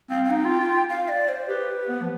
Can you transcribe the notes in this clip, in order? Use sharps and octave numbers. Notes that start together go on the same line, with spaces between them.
C4 F5
F5
D#4 G5
F4
F4
F5
D5
C5
G4 B4
B3
F3